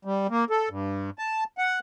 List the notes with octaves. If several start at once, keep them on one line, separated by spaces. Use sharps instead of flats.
G3
A#3
A4
G2
A5
F#5